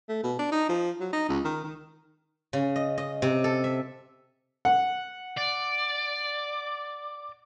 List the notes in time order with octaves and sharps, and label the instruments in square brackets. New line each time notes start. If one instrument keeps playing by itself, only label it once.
[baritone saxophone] A3
B2
D4
D#4
F3
F#3
D#4
C#2
D#3
D#3
[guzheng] C#3
D#5
D#5
C3
A4
E5
[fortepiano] F#5
[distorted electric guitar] D5